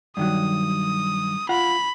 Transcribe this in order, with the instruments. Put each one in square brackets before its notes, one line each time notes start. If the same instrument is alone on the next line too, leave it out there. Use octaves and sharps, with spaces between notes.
[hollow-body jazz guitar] G2 D#3 F#3 [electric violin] D#6
[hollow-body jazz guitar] F4 F#5 [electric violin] B5